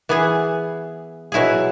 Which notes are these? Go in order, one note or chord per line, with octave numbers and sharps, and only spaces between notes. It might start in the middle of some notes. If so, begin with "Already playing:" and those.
E3 B3 G#4
B2 F#3 E4 G#4